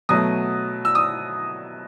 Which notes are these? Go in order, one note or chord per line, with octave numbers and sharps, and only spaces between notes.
B2 F#3 A3 D#6
E6
D#6